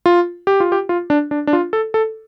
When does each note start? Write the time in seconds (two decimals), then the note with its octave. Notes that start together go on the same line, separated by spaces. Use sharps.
0.06 F4
0.47 G4
0.60 F4
0.72 G4
0.89 F4
1.10 D4
1.31 D4
1.47 D4
1.53 F4
1.73 A4
1.94 A4